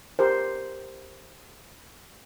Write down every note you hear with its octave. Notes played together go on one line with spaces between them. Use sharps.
G4 A#4 C5